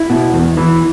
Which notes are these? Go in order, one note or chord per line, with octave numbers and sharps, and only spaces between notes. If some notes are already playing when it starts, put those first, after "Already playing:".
Already playing: E4
B2
E2
E3